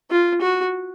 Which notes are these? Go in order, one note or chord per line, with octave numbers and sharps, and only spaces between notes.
F4
F#4